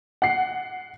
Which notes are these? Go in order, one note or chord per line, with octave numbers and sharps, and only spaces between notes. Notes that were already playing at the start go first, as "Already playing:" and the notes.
F#5 C7